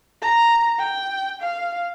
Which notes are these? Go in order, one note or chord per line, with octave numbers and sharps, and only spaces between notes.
A#5
G5
F5